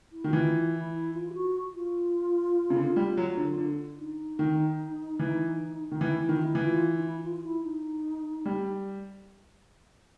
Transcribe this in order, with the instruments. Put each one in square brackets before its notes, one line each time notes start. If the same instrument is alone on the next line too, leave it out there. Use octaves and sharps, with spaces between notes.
[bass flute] E4
[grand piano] D#3 [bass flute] F#4
[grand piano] E3 [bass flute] F4
[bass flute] E4
F4
G4
F#4
F4
[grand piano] C#3
D3
G3
F#3
D3
D3
[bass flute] D#4
[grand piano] D#3
E3
D#3
[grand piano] E3 [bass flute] E4
[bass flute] E4
[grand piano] D#3
[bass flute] F4
E4
[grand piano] E3
[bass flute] F4
D#4
E4
F4
F4
E4
D#4
[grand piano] G3